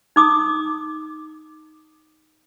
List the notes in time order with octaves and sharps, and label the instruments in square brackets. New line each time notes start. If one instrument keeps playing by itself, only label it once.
[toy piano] D#4 D6 D#6